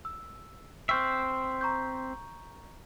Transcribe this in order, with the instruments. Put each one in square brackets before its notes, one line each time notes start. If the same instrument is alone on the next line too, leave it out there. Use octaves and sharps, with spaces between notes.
[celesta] E6
[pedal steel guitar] C4 C5 E5 [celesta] G5 C#6 F6
[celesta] A#5 C#6 G6